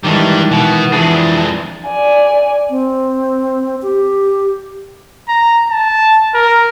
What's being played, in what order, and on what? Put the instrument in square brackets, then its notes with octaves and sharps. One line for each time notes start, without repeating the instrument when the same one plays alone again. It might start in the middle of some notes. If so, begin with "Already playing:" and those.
[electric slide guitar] D#3 E3 G#3 [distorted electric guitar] G3 D4
[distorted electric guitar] B2 B3
[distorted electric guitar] F2 D4 [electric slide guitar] E3 G#4
[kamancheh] D5 G#5
[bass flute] C4
G4
[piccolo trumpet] A#5
A5
A#4